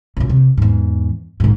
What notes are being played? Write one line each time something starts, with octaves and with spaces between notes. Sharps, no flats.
A1 A#2
C3
E2 G#2
A#1 G#2